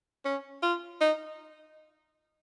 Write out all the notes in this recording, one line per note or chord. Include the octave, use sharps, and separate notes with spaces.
C#4
F4
D#4